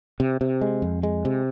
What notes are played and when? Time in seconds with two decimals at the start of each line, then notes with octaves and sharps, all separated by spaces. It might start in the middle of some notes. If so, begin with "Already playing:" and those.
0.20 C3
0.41 C3
0.61 G#3
0.82 F2
1.03 G#3
1.25 C3